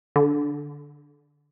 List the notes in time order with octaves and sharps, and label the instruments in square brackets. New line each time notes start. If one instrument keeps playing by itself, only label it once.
[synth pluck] D3